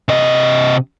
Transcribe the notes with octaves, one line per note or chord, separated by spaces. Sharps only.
C3 D#5